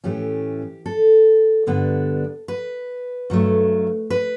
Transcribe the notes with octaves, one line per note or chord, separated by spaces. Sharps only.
A2 E3 A3 C#4 G4
A4
G2 D3 G3 B3 D4
B4
G2 F#3 A3
B4